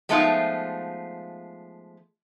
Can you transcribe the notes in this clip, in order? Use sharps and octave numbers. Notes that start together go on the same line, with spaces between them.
F3 G#3 A3 B3 D#4 F4